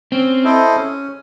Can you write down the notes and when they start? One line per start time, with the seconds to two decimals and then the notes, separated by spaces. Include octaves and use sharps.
0.12 C4 C#4
0.44 E4 A4 C5 D#5
0.76 C#4